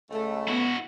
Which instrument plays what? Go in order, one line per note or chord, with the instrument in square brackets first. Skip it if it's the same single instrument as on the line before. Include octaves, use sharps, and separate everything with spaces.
[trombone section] C#2 [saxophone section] A3
[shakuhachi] B3 [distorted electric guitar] E4 F#4